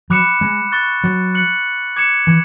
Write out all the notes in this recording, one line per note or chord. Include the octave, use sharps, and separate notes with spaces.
F#3 B5 D6 F#6 C#7 E7
G#3
C#6 F#6 A6
F#3
F#6 C#7 F#7
D6 G#6 C#7 E7
E3